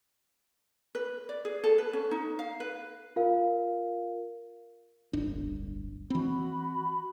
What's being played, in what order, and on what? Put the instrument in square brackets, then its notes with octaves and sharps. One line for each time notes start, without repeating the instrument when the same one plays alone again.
[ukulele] B4
D5
G#4
A4
B4
C#4
D#4
F5
B4
[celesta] F4 A#4 F5
[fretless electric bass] D1 G1 D4
[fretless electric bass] E3 C4 [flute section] F#4 B5